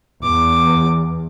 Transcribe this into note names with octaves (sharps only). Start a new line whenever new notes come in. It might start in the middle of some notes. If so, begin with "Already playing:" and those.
E2 D6